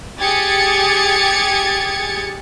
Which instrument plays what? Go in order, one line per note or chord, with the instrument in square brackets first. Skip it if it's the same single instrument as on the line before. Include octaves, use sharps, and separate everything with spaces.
[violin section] G4 G#4 G#6 A6 C#7